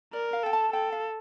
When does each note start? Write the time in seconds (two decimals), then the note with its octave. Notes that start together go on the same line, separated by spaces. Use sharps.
0.13 A#4 D5
0.33 F5
0.43 A4 G5
0.53 A5
0.73 A4 G5
0.92 F5